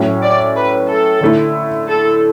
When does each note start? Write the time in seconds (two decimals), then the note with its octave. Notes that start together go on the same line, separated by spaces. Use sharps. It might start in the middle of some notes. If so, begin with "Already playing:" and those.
Already playing: A2 F#3 C#4
0.22 D5
0.56 B4
0.89 A4
1.21 D3 A3 E4
1.87 A4